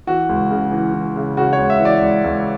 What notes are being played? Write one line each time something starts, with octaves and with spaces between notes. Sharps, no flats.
E3 F#4
C#2
C#3
E3
E3
C#3
C#3 F#4
C#5
C#2
E5
E3
D5
C#2
C#2